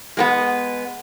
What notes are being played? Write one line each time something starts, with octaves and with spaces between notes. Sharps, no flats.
G#3 A#3 B3